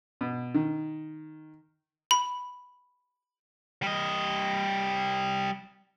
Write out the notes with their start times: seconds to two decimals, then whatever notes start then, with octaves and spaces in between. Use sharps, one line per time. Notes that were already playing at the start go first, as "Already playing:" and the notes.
0.21 B2
0.54 D#3
2.11 B5
3.82 G3 D#5